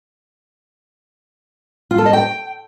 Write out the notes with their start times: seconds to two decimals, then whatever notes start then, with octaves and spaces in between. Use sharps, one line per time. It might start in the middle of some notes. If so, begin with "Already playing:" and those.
1.91 F4
1.98 A4
2.06 D#5
2.13 G5